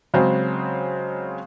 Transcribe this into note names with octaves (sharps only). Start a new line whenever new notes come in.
C#3 F#3 G#3 C4